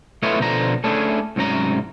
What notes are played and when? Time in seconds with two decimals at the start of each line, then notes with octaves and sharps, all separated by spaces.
0.23 A3 B3 E4 F4 C#5 D#5
0.40 B2 D3 F3 A#5
0.84 A3 C#4 D4 E4 G#4
1.36 C2 G#2 F#3 C#4 A#5